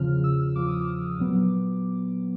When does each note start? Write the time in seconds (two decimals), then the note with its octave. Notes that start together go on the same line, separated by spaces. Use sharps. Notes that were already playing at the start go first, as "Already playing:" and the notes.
Already playing: E2 C#3 F3 F6
0.24 E6
0.55 E2 C#3 F3 D6
0.68 D#6
0.79 D6
1.18 A#2 F#3 B3